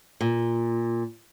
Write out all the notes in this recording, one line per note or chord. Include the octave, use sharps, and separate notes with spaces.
A#2